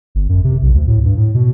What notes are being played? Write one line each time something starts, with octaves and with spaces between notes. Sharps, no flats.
G1
F#2
C3
B1
D2
A2
G2
A2
B2